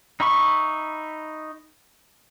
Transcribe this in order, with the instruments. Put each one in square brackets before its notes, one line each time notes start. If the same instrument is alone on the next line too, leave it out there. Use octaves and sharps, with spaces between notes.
[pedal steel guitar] D#4 E5 B5 C#6